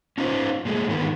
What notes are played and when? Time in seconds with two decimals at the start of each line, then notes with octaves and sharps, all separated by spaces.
0.18 C#4 D#4 F4 C5
0.65 A#2 G#3 A3
0.88 G#2 D3 D#3 B3